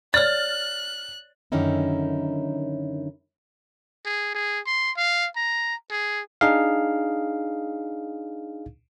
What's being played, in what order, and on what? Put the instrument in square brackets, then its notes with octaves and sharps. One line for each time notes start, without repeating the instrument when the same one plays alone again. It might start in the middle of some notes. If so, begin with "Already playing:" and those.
[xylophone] C#5 D5 [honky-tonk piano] F6 A6 [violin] F#6
[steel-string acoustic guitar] F#2 D3 D#3 C#4 D#4 E4
[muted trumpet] G#4
G#4
C6
F5
A#5
G#4
[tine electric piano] D4 D#4 G#4 F5